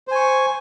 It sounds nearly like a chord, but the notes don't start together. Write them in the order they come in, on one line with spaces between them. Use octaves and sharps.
C5 G#5 C#6